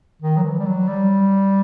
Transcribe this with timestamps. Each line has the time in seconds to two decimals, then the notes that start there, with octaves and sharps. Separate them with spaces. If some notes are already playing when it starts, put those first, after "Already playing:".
0.22 D#3
0.37 F#3
0.44 E3
0.59 G3
0.66 F#3
0.88 G3